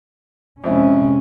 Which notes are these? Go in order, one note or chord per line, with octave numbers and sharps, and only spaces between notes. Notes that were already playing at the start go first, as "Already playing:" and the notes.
F2 C3 G#3 C4 C#4 E4